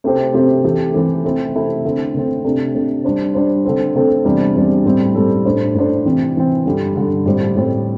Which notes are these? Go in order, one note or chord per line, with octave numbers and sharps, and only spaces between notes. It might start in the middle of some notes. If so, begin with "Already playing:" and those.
C3 A3 C4 G4 C5
C3 A3 C4 G4 C5
E3 A3 C4 G4
E3 A3 C4 G4
C3 A3 C4 E4
C3 A3 C4 E4
D3 A3 C4
D3 A3 C4
C3 A3 D4
C3 A3 D4
G3 D4 C5
G3 D4 C5
D3 A3 C4 A4 C5
D3 A3 C4 A4 C5
E2 C3 G3 D4 C5
E2 C3 G3 D4 C5
A2 G3 C4 A4
A2 G3 C4 A4
A2 A3 D4 C5
A2 A3 D4 C5
C3 E3 C4
C3 E3 C4
G2 D3 G3
G2 D3 G3
A2 G3 C4 G4 C5
A2 G3 C4 G4 C5